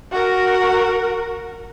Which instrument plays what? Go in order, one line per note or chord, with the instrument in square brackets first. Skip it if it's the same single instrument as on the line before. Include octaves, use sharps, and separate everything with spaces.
[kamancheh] F#4 A#4